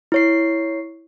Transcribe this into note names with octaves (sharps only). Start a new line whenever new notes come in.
E4 C#5 C7